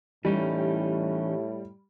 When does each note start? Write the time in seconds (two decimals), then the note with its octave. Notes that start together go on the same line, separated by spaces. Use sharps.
0.25 A2 E3 G3 C#4 D#4